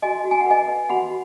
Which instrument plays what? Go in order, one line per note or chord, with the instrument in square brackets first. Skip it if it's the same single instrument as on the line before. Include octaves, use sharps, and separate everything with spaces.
[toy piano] F#4 D#5 G#5
F#4
G#5
F#5
B4 D#5 G#5
B4
F#4 F#5 B5